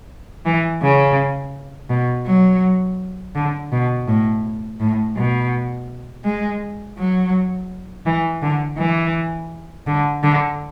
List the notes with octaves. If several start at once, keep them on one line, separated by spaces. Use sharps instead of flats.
E3
C#3
B2
F#3
D3
B2
A2
A2
B2
G#3
F#3
E3
D3
E3
D3
D3